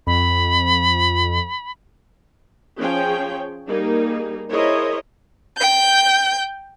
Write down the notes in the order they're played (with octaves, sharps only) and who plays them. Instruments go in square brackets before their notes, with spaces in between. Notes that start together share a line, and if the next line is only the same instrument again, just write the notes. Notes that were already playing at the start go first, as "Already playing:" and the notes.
[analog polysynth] F2 [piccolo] B5
[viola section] F3 C#4 G#4 C#5 G5
G3 A#3 D#4 G#4
E4 G#4 A#4 C5 C#5 D#5
[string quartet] G5 G6